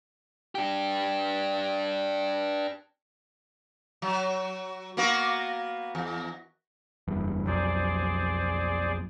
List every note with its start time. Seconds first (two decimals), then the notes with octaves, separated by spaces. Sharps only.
0.55 D4 G4
4.02 F#3
4.97 A#3 B3 F#4
5.95 E2
7.07 F#1 E2 G2
7.47 B1 F2 F#3 G#4 C5 D5